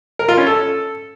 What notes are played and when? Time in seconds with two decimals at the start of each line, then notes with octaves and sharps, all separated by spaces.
0.19 A#4
0.28 F4
0.38 C#4
0.47 A4